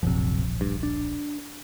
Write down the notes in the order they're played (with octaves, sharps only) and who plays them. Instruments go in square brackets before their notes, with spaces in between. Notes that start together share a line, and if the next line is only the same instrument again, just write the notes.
[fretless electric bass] D1 A#1 F3 [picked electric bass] F#2 C3
[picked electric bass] G2
D4